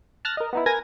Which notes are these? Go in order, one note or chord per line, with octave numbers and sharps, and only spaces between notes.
A5 F6 F#6 A6 A#6
A#4 D#5
B3 D#4 E4
A#4 B4 G#5 G#6 A#6